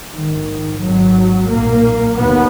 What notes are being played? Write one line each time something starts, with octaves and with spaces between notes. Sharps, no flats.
A#1 G#2 D#3
G#1 G#2 F#3
B1 A#2 A#3
D#2 B3